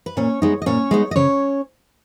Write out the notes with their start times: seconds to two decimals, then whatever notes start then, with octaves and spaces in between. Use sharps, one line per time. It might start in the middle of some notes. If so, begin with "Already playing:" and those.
0.06 B4
0.17 A#2 C#4 C#5
0.42 G#3 B3 D#4
0.62 D#5
0.66 A#2 C#4 C#5
0.91 G#3 B3 D#4
1.11 D#5
1.16 C#3 C#4 C#5